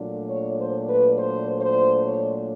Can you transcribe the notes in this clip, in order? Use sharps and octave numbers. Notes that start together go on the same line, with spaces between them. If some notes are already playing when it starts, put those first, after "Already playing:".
Already playing: A#2 F#3 A3 D4
C#5
C5
B4
C5
C5
C#5